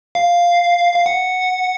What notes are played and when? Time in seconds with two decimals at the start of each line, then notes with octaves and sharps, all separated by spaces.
0.15 F5
0.96 F5
1.06 F#5